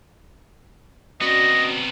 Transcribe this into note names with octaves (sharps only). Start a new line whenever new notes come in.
C3 B3 C#4 F#4 D5 D#5